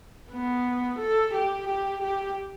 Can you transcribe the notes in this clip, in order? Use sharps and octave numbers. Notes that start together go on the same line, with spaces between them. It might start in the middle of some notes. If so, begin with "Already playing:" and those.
B3
A4
G4
G4
G4